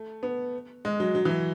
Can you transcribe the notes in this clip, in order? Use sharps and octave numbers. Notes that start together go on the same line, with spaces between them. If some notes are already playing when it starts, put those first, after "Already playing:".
Already playing: A3
B3
G#3
F#3
F#3
E3
F#3